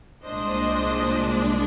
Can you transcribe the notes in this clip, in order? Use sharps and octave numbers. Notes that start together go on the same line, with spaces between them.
C2 A#2 G#3 D4 C5 D#5